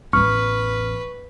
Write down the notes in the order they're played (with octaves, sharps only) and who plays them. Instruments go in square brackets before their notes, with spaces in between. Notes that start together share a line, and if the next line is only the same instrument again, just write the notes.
[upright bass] A1 E2 [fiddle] B4 [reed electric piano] C#6 [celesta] F6